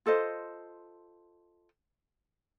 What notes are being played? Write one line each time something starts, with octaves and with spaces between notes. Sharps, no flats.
F4 A4 C5 D#5